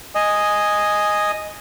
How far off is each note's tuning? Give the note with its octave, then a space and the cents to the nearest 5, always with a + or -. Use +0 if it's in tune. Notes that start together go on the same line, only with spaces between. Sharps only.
D#5 +0 G#5 +0